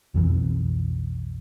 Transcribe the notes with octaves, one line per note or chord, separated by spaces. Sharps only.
B1 F2 E3